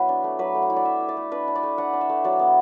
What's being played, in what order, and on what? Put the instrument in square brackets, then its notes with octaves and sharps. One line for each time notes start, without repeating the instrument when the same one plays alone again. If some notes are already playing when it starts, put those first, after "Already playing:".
Already playing: [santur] F#3 B3 E4 B4
D4
A3
F#3 B4
A3
F#5
E4
D5
E4 E5
E4
D5
A3
D4 B4
D4
D5
A3
D4 F#5
D4
E5
A3
F#3 D5
B3